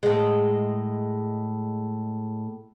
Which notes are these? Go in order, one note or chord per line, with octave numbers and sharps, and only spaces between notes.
A2 G#3